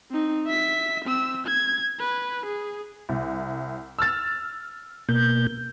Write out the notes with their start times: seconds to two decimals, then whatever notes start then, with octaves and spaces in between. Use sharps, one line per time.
0.11 C4 D#4
0.46 E5 B6
1.05 C4 E6
1.47 G#6
2.00 B4
2.46 G#4
3.09 C2
3.99 E6 F6 A6
5.09 B2 A#3 G6